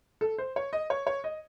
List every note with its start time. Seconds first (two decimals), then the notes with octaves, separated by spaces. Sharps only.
0.21 A4
0.38 C5
0.56 C#5
0.73 D#5
0.90 C#5
1.07 C#5
1.24 D#5